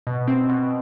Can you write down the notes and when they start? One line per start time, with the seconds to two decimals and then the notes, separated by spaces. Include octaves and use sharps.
0.07 B2
0.28 C4
0.49 B2